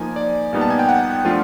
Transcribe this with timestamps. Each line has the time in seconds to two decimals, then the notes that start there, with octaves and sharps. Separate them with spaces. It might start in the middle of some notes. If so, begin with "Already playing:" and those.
Already playing: F3 A#3 D#4 G#5
0.16 D5
0.53 A#2 G3 B3 D#4
0.61 A5
0.70 G#5
0.79 G5
0.89 F#5
1.25 F3 A3 D4 F4